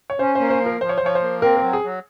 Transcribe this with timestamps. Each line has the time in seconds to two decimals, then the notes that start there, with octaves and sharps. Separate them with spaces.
0.10 C#5
0.19 C#4 C5
0.35 A#3 C5
0.50 C5
0.61 F3
0.66 A#4
0.81 F3 C5
0.89 C#5
0.98 C5
1.02 F3 C#5
1.15 C5
1.22 A#3
1.42 C4 A#4
1.57 A#4
1.62 F#3
1.73 G#4
1.84 F#3